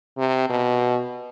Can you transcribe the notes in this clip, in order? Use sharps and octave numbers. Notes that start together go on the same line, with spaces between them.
C3
B2